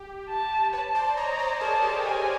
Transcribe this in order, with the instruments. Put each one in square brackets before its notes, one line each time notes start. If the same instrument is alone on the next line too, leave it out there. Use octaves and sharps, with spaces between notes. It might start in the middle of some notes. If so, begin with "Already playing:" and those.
Already playing: [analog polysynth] G4
[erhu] A5
[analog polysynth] B4 C#5 [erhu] A5
[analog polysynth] C5 D5
[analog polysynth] C#5 D#5 [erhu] A#5
[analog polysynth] C5 D5
[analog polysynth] G#4 A#4 [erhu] A5
[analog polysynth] G4 A4
[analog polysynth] G#4 [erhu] G#5